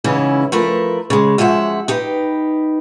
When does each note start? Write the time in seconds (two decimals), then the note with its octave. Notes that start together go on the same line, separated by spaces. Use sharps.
0.04 G#2 C#3 E3 C#4 E4
0.52 F3 A3 A#4 B4
1.10 C#3 G#3
1.38 F#2 F3 G#3 E5 F#5
1.88 D#4 G4 B4